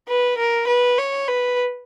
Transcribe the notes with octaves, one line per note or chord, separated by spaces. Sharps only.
B4
A#4
B4
C#5
B4